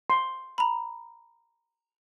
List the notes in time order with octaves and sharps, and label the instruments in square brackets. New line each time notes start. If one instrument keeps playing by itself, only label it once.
[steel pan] C6
[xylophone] A#5 B5